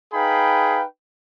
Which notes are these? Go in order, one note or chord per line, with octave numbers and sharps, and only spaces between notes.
D#4 G#4 B4 F5 G5 B5